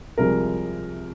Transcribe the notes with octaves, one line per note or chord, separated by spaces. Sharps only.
C2 C3 F3 G#3 A#4